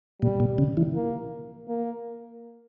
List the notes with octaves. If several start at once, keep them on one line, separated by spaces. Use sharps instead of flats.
A#2 G3
A#2
C#3
E3
A#3
A#3